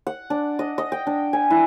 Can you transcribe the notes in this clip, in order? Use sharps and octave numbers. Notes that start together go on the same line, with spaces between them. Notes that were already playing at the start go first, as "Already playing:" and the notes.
F#5
D4
D#5
D#5
G5
D4
G#5
E4